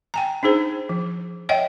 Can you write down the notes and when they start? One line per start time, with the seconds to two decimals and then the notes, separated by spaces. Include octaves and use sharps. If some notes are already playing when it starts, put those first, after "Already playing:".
0.14 G5 G#5 A#5
0.43 D4 D#4 G#4 C5
0.89 F3
1.49 C#5 D#5 E5 F#5 G5